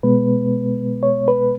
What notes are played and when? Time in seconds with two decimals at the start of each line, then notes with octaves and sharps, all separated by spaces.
0.03 B2 G#3 B3 B4
1.03 C#5
1.28 B4